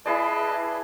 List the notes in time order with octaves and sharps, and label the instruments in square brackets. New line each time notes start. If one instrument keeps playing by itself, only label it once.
[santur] E4 G#4 D5 [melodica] B4 D#5 A5